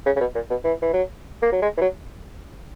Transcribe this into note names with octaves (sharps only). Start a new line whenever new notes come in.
C#3
C#3
B2
A#2
B2
E3
E3
F#3
A#3
F#3
G#3
E3
F#3